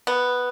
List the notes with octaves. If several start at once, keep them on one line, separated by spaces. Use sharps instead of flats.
B3